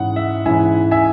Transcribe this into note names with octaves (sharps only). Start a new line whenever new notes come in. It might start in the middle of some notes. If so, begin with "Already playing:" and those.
Already playing: G#2 E3 C#4 E4 F#5
E5
G#2 E3 C#4 E4 E5 G#5
E5 G#5